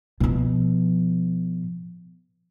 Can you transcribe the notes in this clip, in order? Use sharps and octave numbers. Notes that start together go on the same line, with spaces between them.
B2 F3